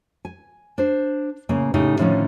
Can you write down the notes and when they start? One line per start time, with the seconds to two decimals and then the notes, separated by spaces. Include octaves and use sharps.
0.25 G#5
0.78 D4 C5
1.49 A2 C#3 A#3 G#5
1.74 A2 C#3 G3 D#4
1.99 A2 D3 D#3 F3 C#4 D#4